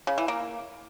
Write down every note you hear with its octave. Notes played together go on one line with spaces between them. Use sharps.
C#3
E3
A#3